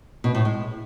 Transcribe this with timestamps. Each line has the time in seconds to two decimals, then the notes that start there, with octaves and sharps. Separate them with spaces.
0.24 B2
0.35 A2
0.45 G#3